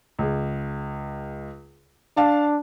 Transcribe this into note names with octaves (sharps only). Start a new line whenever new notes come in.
C#2 G#4
D4 F5 A5